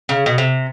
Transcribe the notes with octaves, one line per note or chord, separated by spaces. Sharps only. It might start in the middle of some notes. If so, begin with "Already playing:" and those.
C#3
B2
C3